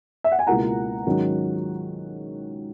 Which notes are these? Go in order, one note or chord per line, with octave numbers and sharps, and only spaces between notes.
E5
F#5
G#5
C#2 B2 A#3 E4 F#5 A#5
G#2 D#3 F#3 C#4